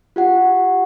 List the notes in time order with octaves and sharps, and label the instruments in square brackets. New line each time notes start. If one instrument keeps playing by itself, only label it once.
[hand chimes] F4 G4 F#5